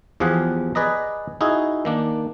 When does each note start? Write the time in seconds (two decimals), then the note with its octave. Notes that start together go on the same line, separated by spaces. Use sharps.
0.20 E2 F3 G4 G#4 F5 F#5
0.75 G#4 B4 D5 D#5 A#5
1.41 D#4 E4 F#4 G#4
1.85 D#3 A#3 D4